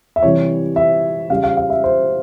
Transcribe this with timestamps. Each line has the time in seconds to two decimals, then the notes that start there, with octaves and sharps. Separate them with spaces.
0.16 E5
0.23 C3 E3 G3 C#5
0.76 E5
1.30 C#3 G3 F5
1.44 F5
1.57 F5
1.70 E5
1.84 C5